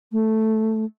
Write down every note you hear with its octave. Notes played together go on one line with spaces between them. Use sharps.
A3